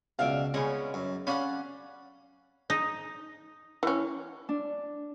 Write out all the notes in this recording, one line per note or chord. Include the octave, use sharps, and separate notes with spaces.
C#2 B2 D5 E5 F5
C#3 G#3 B3 C#4
F#2
C#4 D5 F5 F#5 B5
D#4
E3 C#4
D4